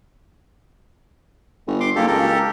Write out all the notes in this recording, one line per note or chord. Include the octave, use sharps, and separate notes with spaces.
G1
C6 D6
F#1 A#3 G4 A4
C#2 G4 A4 A#4